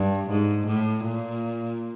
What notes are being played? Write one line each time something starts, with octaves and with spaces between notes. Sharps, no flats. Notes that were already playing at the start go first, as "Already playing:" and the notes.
Already playing: G2
G#2
A2
A#2